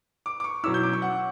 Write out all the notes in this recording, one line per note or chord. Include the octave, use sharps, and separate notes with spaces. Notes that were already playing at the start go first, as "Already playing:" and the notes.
D6
D6
C#6
B2 F#3 C#4 E4 E6
G6
D6
C#6
F#5